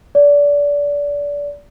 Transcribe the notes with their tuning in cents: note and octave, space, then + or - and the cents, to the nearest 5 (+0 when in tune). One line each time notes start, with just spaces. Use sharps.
D5 -25